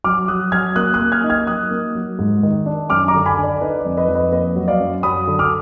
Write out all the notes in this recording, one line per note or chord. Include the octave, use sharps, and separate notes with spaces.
F#3 D6 F6
F#3 D#6 F#6
F#3 F6 G#6
A#3 D#6 F#6
D#6 F#6
A#3
F6 G#6
D#4
F6 G#6
F#3 D#6 F#6
A#3
F#3
G#2
D#3
D4
F#2 D6 F6
A#5 D6
D3
G#5 B5
D3
D5
D#4 B4
D5
F2
B4 D#5
F2
B4 D#5
A#3 B4 D#5
F#3
D5 F5
F#2
F#3 B5 D#6
D3
D6 F6